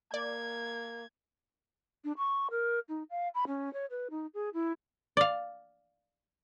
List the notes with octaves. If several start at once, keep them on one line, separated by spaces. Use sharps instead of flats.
A#3 D5 G#6
D4
C#6
A#4
D#4
F5
B5
C#4
C#5
B4
D#4
G#4
E4
D5 F5